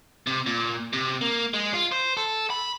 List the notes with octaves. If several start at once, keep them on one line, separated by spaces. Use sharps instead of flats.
C3
A#2
C3
A#3
G#3
F4
C5
A4
B5